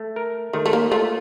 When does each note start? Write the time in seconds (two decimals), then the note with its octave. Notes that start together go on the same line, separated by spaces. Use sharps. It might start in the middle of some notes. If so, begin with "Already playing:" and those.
Already playing: A3
0.16 A#4
0.53 D#3 A3
0.66 A3
0.73 A#3
0.91 A3 F4